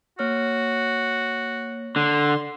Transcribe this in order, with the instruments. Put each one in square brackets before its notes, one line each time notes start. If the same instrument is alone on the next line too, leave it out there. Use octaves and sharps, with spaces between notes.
[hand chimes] A#3 C#5 F6 [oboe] F#4
[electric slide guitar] D3 [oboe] C6